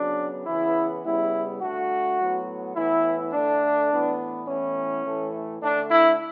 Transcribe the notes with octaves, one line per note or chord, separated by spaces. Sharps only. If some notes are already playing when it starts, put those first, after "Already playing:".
Already playing: C#3 F#3 B3 D4
C#3 E3 B3 E4
C#3 G3 B3 E4
D3 A3 F#4
A2 F#3 B3
A2 E3 B3 E4
D3 A3 D4
A2 E3 B3
A2 E3 B3 C#4
A2 E3 A3
D3 A3 D4
E4